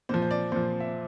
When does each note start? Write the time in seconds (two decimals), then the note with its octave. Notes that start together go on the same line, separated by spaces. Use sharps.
0.09 A#2 F3 C5
0.22 C5
0.31 D5
0.52 A#2 F3 C5
0.80 E5